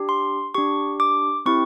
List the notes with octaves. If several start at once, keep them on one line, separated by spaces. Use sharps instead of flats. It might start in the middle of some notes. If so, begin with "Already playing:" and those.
Already playing: D4 G4
C6
D4 G4 C#6
D6
C4 E4 G4 C#6